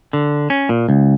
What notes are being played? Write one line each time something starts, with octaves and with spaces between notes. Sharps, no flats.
D3
C#4
A#2
C#2